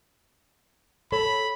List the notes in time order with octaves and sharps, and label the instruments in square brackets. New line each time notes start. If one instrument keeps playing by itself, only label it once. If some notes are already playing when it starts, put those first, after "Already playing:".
[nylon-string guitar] A4 C#5 [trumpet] B5